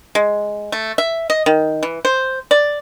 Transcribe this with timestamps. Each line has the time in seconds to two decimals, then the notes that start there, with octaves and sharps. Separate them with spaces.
0.15 G#3
0.72 A3
0.98 E5
1.30 D#5
1.46 D#3
1.83 E3
2.05 C5
2.51 D5